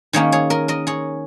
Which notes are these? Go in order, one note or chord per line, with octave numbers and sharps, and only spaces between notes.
D#3 A#3 C#4 G#4 C#5
G#4 C#5
A#4 D#5
A#4 D#5
G#4 C#5